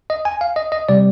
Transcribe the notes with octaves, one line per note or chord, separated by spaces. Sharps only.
D#5
G#5
F5
D#5
D#5
C3 G3 D5